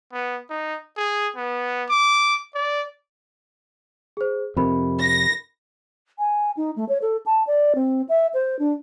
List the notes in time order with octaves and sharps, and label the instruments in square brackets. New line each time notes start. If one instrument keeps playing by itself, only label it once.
[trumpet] B3
D#4
G#4
B3
D6
D5
[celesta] G#4 C5
[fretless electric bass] F2 C3 [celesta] A#4 B5
[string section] A#6
[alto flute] G#5
D#4
A3
C#5
A4
A5
D5
C4
E5
C5
D4